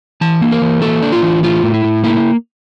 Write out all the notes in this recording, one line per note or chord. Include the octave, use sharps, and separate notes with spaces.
E3 A5
A#3
A#4
E3
A#3 A4
D4
F4
E3
A2 F4
A2
E4
A2
A#3 E4